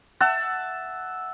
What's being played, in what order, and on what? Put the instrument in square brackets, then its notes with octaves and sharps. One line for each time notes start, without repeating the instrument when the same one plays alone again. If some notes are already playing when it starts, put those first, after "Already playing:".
[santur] E5 F#5 A5 E6